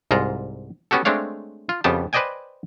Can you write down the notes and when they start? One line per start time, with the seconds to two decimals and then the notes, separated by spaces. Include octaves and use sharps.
0.11 C2 G#2 F4 A#5
0.91 B3 C#4 F#4 G4 A4
1.05 G#3 A3 C4 D4 C#5 F5
1.69 F4
1.84 F2 C#3 B3 G4 A5
2.13 B4 C5 D5 D#5 G5 G#5